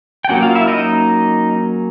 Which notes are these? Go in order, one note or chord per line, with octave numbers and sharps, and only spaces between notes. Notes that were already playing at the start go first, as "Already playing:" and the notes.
G5
F#3 A#3 C#4 F#4 F#5
F4 F5
E4 E5
D#4 D#5